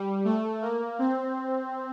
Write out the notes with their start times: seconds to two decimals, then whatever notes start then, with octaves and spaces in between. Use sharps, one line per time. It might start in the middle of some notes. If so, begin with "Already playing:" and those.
Already playing: G3
0.25 A3
0.62 A#3
0.99 C4